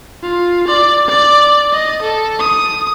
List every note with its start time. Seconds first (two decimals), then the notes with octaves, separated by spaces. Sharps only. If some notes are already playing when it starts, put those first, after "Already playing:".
0.23 F4
0.68 D5
1.08 D5
1.73 D#5
2.02 A4
2.39 D#6